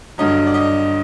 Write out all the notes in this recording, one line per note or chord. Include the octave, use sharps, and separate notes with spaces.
G2 D3 F#3 D#5
D5
D#5